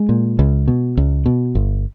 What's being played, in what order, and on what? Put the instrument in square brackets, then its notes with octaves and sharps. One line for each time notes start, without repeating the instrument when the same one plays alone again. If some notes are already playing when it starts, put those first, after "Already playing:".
Already playing: [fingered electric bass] G#3
A#2
C#2
B2
C#2
B2
G1